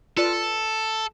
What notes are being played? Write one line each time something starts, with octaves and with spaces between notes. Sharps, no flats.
F4 A4 B4 D5